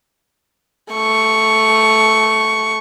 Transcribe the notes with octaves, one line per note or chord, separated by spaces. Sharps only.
A3 C#6